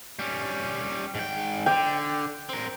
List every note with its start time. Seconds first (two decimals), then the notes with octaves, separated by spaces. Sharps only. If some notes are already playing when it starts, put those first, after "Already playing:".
0.19 G3 C#4
1.15 G#2 G5
1.66 D3 G5
2.49 C4 A#4